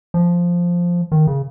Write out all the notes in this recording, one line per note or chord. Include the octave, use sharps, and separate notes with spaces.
F3
D#3
C#3